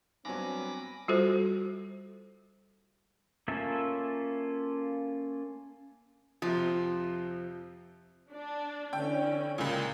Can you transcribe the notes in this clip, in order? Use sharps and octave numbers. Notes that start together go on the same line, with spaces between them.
G2 F#3 B3 C4 G#5 B5 D6 A#6
G3 F4 F#4 A4 C5
A#3 C#4 F4 A4 E5
F2 C3 F3
D4
D3 E3 C#4 G5
C#2 A#2